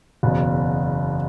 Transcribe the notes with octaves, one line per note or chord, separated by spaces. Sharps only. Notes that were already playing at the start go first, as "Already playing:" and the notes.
F#1 E2 B2